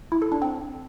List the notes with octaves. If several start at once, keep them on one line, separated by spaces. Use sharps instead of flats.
E4
A4
D4
C4